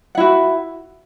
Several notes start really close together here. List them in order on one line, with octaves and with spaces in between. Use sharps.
F#5 E4 F#4